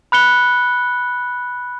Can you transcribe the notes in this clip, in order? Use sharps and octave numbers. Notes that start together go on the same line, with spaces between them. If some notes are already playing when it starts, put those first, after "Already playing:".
B5 F#6 C#7 G7